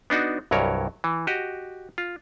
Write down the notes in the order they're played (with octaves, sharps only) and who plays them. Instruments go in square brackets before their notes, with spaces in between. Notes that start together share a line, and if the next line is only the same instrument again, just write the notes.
[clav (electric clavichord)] B3 D4 D#4 F#4
C2 G2 F#3 A#4 C#5
E3
F#4 G4 D#5
F4